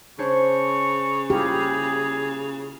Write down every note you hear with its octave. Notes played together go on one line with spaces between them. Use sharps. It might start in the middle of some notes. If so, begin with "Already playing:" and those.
C#3 D4 C5 C#5 C#6
A#3 E4 F4 G4 G#4